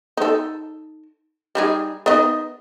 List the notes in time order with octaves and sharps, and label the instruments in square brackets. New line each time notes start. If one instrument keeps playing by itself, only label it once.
[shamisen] D#4 A4
G3 D#4 G#4
B3 D#4 D#5